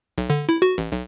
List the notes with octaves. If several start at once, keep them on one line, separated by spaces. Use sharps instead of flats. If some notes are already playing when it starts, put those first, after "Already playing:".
B1
D3
E4
F#4
A1
B1